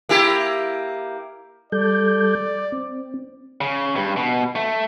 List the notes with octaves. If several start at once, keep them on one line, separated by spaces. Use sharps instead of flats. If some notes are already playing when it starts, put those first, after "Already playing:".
A#3 E4 G4
G3 A4 D5 G6
C4
C#3
G2
B2
A3